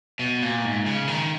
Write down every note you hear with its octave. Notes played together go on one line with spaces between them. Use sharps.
B2
A#2
G#2
C#3
D#3